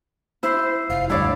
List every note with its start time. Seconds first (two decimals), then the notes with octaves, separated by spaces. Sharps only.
0.43 E4 C5
0.90 F1 F5
1.10 D2 G2 E4 C#5 D5